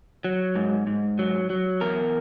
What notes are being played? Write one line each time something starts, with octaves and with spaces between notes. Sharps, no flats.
F#3
G#2
G#2
F#3
F#3
E2 A#4